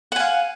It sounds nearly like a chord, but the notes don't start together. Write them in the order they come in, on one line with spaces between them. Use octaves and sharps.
F#5 G#5 F5